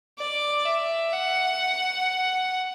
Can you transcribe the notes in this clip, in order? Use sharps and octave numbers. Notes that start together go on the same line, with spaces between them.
D5
E5
F#5